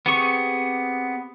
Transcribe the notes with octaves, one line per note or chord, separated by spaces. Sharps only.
B3 C4 G4 G#4 C#6